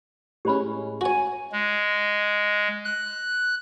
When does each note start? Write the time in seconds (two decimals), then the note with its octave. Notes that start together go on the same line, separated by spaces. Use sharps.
0.45 A2 G#3 C#4 G4 C5 B5
1.01 F#4 C#5 G#5
1.52 G#3
2.85 F#6